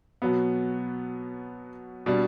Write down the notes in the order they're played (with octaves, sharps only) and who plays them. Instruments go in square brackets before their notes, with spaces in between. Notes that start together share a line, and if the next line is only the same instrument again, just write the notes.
[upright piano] B2 F#3 B3
B2 G3 D4